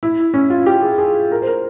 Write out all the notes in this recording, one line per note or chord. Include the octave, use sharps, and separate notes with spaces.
E4
C#4
F4
G4
G#4
G#4
A#4
C5
A#4